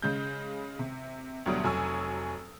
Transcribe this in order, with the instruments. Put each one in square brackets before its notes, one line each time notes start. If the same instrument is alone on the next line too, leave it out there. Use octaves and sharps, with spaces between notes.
[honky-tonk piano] C#3 G#3 G6
C3
D2 B2 F#3 G3 D#6 D7
F1 F#3 G#5 C#6 E6